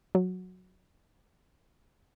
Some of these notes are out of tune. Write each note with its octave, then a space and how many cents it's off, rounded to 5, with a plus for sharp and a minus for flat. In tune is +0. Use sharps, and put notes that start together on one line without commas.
F#3 -10